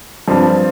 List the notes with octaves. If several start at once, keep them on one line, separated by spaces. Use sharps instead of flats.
G2 F3 C4